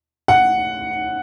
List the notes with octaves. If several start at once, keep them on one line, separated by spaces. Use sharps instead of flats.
F#5